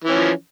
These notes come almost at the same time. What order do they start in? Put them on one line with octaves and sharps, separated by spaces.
E3 C#4 F3